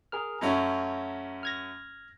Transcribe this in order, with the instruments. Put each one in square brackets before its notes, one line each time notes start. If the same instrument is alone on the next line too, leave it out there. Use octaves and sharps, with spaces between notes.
[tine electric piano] G#4 A#4 F6
[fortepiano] F#2 A3 C#4 [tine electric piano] A#5
[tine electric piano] F6 G#6 A#6